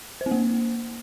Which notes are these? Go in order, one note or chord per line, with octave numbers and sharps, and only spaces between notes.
C5
C4
A#3